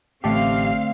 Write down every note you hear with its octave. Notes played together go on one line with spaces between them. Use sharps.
A1 D3 A3 C4 G4 F5